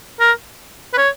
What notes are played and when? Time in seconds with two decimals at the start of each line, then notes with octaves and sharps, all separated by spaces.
0.20 A#4
0.93 B4
0.98 C#5